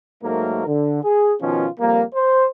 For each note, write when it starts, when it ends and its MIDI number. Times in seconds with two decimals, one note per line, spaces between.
0.23 0.64 44
0.23 0.64 54
0.23 0.64 57
0.23 0.64 58
0.23 0.64 70
0.66 1.00 50
1.02 1.33 68
1.41 1.66 47
1.41 1.66 51
1.41 1.66 53
1.41 1.66 61
1.41 1.66 65
1.79 2.02 41
1.79 2.02 55
1.79 2.02 58
2.14 2.45 72